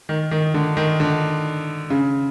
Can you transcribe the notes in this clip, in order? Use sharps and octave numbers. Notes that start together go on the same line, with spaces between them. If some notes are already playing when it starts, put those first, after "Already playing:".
D#3
D#3
D3
D#3
D3
C#3